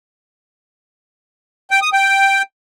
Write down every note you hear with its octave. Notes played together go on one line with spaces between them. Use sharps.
G5
D#6
G5